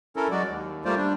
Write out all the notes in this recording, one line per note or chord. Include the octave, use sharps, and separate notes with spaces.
C#4 E4 A4 A#4
F#3 G#3 F#4 D5
D#2
G3 A3 A#3 F4 C5 D5
G3 D4